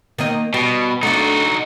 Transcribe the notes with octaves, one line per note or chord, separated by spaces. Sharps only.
D#3 A#3 D#5
B2 G3
A3 D4 D#4 F#4